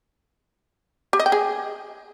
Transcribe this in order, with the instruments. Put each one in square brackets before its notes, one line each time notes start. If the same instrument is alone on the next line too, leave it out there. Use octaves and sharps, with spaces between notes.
[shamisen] G4
D#5
G5
G#4